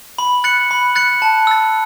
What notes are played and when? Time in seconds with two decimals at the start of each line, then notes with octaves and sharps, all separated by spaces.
0.18 B5
0.44 F#6 A6 C#7 F#7
0.71 B5
0.95 F#6 A6 C#7 F#7
1.22 A5
1.47 E6 A6